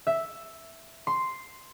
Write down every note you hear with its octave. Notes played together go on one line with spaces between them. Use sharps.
E5
C6